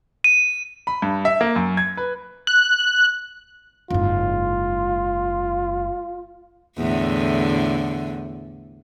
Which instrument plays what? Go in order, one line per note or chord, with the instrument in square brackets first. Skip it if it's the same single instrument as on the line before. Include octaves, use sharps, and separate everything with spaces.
[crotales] D#7
[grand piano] B5
G2
E5
A#3
F#2
G#6
B4
[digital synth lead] F#6
[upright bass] F#1 G#2 [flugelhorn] F4
[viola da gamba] E2 A2 D3